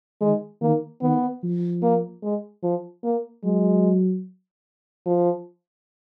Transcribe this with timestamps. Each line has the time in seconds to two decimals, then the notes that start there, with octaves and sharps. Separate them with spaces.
0.21 D#3 G#3
0.62 D#3 A#3
1.02 D#3 B3
1.43 F3
1.83 A#3
2.23 G#3
2.63 F3
3.04 A#3
3.44 F#3 G#3
5.06 F3